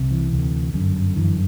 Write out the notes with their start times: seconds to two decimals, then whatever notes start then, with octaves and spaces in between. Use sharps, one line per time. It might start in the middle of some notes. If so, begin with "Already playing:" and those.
Already playing: C2 C3
0.11 E3
0.32 D2 C3
0.74 G1 F#2 D3
1.16 G1 F#2 D3 E3